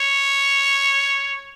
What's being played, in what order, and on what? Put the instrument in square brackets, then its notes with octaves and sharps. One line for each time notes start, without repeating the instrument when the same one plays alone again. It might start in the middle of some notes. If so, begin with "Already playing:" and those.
Already playing: [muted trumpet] C#5